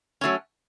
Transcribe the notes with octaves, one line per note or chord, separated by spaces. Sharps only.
F#3 A3 C#4